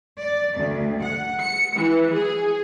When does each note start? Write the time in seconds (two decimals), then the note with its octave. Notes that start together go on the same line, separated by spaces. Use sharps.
0.21 D5
0.58 D2
1.03 F#5
1.40 C#7
1.75 E3
2.15 G#4